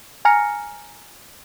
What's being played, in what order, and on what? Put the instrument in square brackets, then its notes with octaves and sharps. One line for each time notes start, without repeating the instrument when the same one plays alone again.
[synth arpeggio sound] G#5 A#5 F6 A#6 C#7